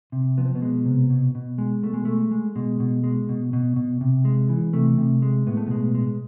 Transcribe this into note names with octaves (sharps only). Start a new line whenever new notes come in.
C3
F3 B3
C4
B2 B3
G#3
C3
B2
B2
G#3
B2 A3
G#3
G#3 A3
G#3
B2 G#3
B2
G#3
B2
B2
B2
C3
G#3
E3
C3 A3
C3
G#3
A2 B3
A3
B2 G#3 B3
G#3